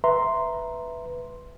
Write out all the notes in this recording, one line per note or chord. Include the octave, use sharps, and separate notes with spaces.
B4 E5 A#5 C6